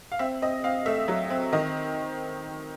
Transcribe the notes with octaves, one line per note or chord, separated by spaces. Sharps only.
F5
C4 E5
C4 D#5
C4 F5
A3 E5
F#3
C4
D#3 D#5